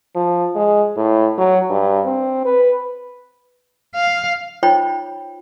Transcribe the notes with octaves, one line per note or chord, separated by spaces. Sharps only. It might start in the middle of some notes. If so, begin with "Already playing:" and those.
F3
G#3
A2
F#3
G2
C4
B4
F5
D#4 F4 C5 C#5 G5 B5